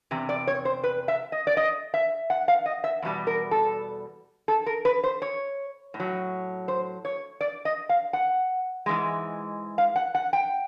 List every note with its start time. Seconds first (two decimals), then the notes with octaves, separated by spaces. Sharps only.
0.11 E2 C3
0.29 D5
0.47 C#5
0.65 C5
0.84 B4
1.08 E5
1.32 D#5
1.47 D5
1.57 D#5
1.94 E5
2.30 F#5
2.48 F5
2.66 D#5
2.84 E5
3.02 E2 B2 G3
3.27 A#4
3.51 A4
4.48 A4
4.66 A#4
4.85 B4
5.04 C5
5.22 C#5
5.94 A2
6.00 F#3
6.68 C5
7.05 C#5
7.41 D5
7.65 D#5
7.89 F5
8.13 F#5
8.86 G#2 E3 G#3
9.78 F5
9.96 F#5
10.15 F#5
10.33 G5